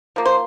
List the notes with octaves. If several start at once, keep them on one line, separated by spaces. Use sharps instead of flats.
F3 A#3
C5